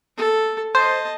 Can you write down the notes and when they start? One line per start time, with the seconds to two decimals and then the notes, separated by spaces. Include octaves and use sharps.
0.17 A4
0.75 C5 D#5 A5